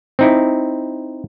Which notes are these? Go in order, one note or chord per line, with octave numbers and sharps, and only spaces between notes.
C4 D#4 E4